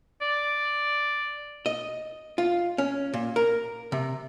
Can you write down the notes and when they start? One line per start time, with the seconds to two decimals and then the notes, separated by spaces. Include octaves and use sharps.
0.22 D5
1.66 D#5
2.38 F4
2.78 C#4
3.14 A#2
3.36 A#4
3.92 C3